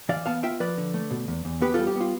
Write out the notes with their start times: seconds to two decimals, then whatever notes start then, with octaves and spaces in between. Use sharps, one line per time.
0.09 E3 D5 F5
0.26 B3 F5 A5
0.43 F4 E5 G5
0.60 F3 B4 D5
0.77 D3
0.94 A3
1.11 B2
1.28 E2
1.45 E2
1.62 B3 G4 B4
1.74 G3 F4 A4
1.87 G4
1.96 B3 F4